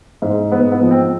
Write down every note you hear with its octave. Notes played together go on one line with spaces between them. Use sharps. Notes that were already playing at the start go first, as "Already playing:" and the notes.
G#2
G#2 B3
B3
F3
C4